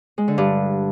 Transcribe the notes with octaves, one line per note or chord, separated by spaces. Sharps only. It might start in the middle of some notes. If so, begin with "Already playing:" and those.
G#3
D3
G2